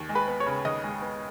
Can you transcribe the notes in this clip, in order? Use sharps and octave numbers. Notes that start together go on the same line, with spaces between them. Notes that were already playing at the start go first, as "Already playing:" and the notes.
Already playing: D#2
G#3
B4 B5
B3
C#5 C#6
C#3
D#2 D#5 D#6
G#3
B3